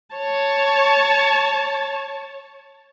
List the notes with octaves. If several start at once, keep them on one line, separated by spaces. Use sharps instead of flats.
C#5 A5